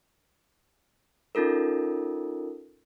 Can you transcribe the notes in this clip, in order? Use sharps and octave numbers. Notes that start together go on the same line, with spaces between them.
C#4 D#4 F4 A4 A#4